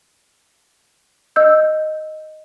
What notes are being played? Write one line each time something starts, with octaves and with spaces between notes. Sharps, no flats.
D#5 E6 G6